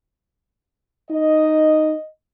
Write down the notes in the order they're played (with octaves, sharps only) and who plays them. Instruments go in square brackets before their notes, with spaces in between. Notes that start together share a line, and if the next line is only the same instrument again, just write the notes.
[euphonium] D#4 [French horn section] D#5